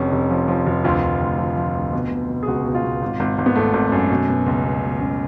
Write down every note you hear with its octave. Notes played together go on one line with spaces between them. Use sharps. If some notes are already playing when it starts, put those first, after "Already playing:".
Already playing: F1 F2 C#4
F1
F3
F3
F1
D2 F4
D2
D2
F3
F3
D2
B2
B2
B2
G#4
C#2 F#4
B2
F4
B2
G#1
G#1
G#1
B3
G#1 A3
G#1
F#2
B2
B2
C#2
B2
B2
C#2